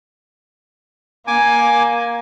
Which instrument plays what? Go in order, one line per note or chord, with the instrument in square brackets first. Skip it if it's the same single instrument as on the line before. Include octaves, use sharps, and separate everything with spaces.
[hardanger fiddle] A#3 [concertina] G#5 D6